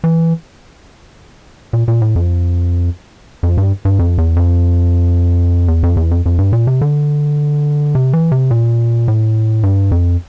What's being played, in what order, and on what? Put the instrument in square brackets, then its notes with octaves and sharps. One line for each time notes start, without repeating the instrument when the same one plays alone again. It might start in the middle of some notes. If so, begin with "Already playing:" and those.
[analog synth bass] E3
A#2
A#2
A2
F2
F2
G2
G2
F2
E2
F2
E2
F2
E2
F2
F2
G2
A#2
C3
D3
C3
E3
C3
A#2
A2
G2
F2